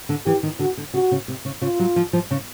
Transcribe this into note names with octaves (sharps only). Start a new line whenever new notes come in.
D3
E3 G4
D#3
D3 F#4
D3
C#3 F#4
C#3
C3
C#3
C#3 F4
F#3
F3
F3
C#3